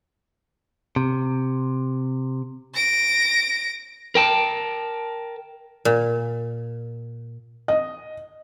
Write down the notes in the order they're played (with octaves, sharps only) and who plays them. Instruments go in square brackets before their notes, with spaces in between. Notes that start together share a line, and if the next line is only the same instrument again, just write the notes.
[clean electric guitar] C3
[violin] A#6 D7
[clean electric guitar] A#4 G5 A5
[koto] A#2
[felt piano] D#5